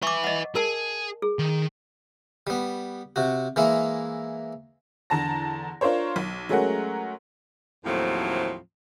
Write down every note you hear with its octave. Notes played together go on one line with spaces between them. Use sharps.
B4 E5 C#6 D6
D#5 F#5
G#4 A#4 A5
G#4
D#3
G3 B3
C3 F#4
E3 G#3 A#3 E4
E2 D3 A5 A#5 A#6
D4 F4 A#4 C5 C#5
B1
F#3 G#3 A3 C#4 A#4 F#5
D#2 A2 F3 F#3 A3 C4